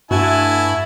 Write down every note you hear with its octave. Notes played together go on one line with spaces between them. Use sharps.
G2 A3 E4 F#4 G#5 A5